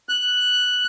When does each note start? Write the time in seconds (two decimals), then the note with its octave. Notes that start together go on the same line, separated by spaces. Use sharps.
0.09 F#6